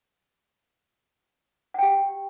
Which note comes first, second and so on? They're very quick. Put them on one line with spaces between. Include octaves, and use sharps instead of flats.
F#5 G5 G4